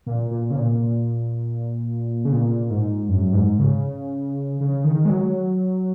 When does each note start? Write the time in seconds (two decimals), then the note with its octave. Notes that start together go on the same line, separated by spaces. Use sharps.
0.06 A#2
0.31 A#2
0.50 C#3
0.56 A#2
2.25 C#3
2.33 A#2
2.70 G#2
3.09 F#2
3.33 G#2
3.59 C#3
4.60 C#3
4.84 D#3
5.05 G#3
5.10 F#3